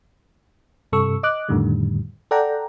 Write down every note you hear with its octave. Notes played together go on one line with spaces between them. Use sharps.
G2 C3 A4 C#6 E6
D#5 D6 F#6
F2 A2 D3 D#3 G3
A4 D5 F#5 G5 A#5